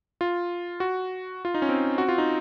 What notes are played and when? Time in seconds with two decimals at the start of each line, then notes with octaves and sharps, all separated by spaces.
0.21 F4
0.80 F#4
1.45 F4
1.54 D#4
1.62 C#4
1.69 C4
1.98 F#4
2.09 F4
2.18 D#4